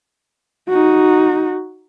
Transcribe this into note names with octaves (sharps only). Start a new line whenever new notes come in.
D#4 F#4